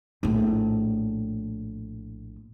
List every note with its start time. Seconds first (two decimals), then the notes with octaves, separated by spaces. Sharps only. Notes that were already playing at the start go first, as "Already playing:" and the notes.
0.23 A#1 A2